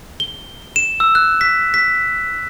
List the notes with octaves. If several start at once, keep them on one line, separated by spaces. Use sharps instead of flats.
G7
E7
E6
F#6
B6
B6